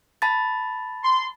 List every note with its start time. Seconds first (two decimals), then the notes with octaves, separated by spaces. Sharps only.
0.22 A5 B5 A6
1.04 C6